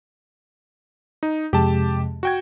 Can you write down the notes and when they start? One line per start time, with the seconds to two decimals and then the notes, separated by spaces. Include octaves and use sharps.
1.23 D#4
1.53 F2 C3 G#3 G4 A5
2.23 F#4 G5 G#6